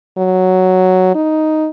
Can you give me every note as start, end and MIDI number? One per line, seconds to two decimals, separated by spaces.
0.18 1.12 54
1.15 1.68 63